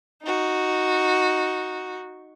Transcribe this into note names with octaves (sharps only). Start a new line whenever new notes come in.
D#4 F#4